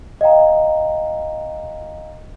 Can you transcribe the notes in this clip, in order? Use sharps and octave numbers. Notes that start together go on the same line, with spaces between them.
D#5 F5 G5 A#5